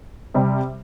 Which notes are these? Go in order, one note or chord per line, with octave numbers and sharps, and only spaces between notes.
C3 G3 C4